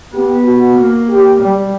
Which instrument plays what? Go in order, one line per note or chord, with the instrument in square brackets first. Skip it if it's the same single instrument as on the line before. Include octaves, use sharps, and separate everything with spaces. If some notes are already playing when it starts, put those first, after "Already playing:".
[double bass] B3 [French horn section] G4
[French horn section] F#4
[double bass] A#3
[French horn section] G4
[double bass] G3